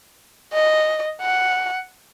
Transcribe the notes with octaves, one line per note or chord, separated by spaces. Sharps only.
D#5
F#5